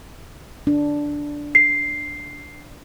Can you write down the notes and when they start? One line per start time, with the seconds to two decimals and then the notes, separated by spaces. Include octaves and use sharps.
0.67 D4
1.55 C7